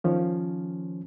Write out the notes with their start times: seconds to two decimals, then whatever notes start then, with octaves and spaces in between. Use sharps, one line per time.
0.04 D#3 F3 C#4